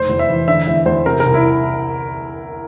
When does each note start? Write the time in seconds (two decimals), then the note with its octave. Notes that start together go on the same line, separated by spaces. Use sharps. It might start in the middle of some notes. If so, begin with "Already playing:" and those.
Already playing: F1 C5
0.09 E2
0.19 E5
0.29 E3
0.48 D3 E5
0.67 E2 E5
0.86 E2 C5
1.05 C3 A#4
1.20 C2 A#4
1.34 E4